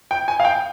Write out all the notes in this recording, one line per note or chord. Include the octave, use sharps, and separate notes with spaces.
G5
G#5
F5
G5